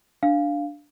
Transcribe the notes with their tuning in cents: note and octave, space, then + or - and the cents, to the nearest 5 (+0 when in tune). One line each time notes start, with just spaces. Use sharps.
D4 +0 F5 +0